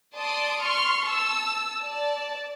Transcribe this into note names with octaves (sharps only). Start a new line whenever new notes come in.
D5 A5 C6 D#6 D7
C6 C#6 F6
A5 E6
D5 A5